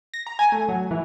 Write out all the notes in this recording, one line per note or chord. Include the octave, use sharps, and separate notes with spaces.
A#6
A#5
G#5
A3
F#3
E3